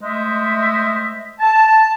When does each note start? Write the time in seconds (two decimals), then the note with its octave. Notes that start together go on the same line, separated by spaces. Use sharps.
0.01 G#3 A3 C5 D#5 E5
1.39 A5